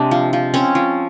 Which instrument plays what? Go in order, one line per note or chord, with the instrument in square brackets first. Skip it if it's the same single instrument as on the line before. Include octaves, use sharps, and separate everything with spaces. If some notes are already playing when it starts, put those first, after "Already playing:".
Already playing: [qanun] C3 G#3 D4
F3
F3
C4 C#4
F3